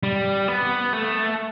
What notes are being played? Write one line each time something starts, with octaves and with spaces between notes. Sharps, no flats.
G3
B3
A3